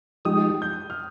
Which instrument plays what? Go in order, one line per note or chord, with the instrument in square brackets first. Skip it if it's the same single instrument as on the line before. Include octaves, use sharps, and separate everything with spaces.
[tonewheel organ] F3 G#3 D#4 G4 [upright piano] D#6
[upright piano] G6
F6